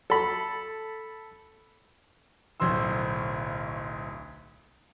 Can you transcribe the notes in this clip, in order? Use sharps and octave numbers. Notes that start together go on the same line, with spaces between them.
A4 B5
D1 B1 C5 C6 E6